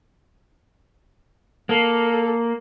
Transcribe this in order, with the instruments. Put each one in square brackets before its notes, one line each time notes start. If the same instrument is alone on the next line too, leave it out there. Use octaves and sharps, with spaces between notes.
[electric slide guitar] A#3 [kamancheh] A4